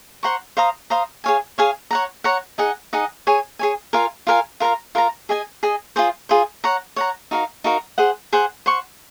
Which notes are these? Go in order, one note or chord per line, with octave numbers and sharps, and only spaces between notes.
C5 F#5 A#5 C#6
C5 F5 A#5 D#6
C5 F5 A#5 D#6
G#4 C#5 F5 G#5
G#4 C#5 F5 G#5
C#5 F#5 A#5
C#5 F#5 A#5
D#4 G#4 D#5 F#5
D#4 G#4 D#5 F#5
G#4 C#5 G#5
G#4 C#5 G#5
F4 A#4 F5 G#5
F4 A#4 F5 G#5
F4 A#4 F5 A#5
F4 A#4 F5 A#5
G#4 D#5 G#5
G#4 D#5 G#5
F4 G#4 C5
F4 G#4 C5
C#5 F#5 A#5
C#5 F#5 A#5
D#4 F#4 A#4 F5
D#4 F#4 A#4 F5
G#4 C5 F#5
G#4 C5 F#5
C5 F#5 C#6